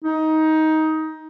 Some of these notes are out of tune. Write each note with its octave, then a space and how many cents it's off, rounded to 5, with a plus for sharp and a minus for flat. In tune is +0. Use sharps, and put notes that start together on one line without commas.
D#4 +15